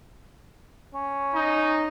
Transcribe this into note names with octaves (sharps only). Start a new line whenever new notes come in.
C#4
D#4